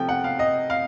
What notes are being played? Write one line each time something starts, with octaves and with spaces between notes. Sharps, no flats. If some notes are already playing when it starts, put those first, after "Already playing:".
Already playing: C3 F3 A3 G5
F#5
F5
D#5
F5